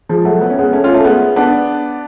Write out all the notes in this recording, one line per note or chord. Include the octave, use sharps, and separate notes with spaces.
F3 G#3
F#3 A3
B3
C#4
G#3 B3
A3 C#4
C#4 F4
A3 C#4
G#3 B3
B3 D4